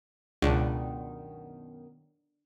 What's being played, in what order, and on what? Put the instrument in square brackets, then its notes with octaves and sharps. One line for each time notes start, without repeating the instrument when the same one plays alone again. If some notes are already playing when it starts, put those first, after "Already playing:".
[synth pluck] C#2 [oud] F#2 B2 D#3 [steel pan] D4